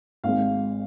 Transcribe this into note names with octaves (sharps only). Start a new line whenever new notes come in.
G#1 G#3 F5